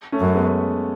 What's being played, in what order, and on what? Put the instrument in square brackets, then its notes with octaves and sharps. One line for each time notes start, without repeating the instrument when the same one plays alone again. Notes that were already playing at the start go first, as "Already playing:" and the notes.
[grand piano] A3 C#4
[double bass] F#2
[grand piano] G#3 B3